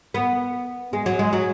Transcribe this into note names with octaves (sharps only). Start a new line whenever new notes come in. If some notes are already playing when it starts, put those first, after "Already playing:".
B3
G#3
F#3
G#3
F#3